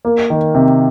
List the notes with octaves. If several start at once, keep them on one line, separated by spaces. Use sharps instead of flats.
A#3
D#3
C3